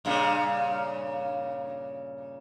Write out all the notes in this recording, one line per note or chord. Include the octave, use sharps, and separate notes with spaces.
G2 A#2 C#3